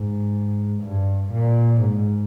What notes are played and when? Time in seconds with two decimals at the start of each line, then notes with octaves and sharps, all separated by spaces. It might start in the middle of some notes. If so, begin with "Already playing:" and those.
Already playing: G#2
0.83 G2
1.33 A#2
1.82 G#2